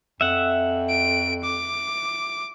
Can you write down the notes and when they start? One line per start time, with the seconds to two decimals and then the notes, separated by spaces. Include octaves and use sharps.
0.21 F2 E5 F#5
0.90 D7
1.44 D6